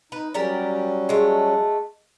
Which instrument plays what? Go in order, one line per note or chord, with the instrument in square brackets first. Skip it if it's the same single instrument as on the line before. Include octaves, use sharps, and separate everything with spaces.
[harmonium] D#4 [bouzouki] B4
[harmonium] F#3 G3 C#4 [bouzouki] G4 A#4 D5
[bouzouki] G#3 A3